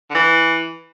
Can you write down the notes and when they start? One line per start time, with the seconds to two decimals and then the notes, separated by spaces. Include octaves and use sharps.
0.10 D3
0.15 E3